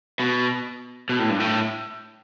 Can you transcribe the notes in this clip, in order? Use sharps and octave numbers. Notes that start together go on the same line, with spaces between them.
B2
B2
A2
G2
A2